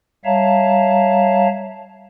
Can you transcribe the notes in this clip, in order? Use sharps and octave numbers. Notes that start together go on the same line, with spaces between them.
G3 C#5 E5 F5 A5 A#5